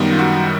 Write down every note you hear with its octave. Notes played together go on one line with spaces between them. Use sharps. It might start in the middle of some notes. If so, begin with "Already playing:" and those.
Already playing: F#2 D#3 G3 B3
F4
F#4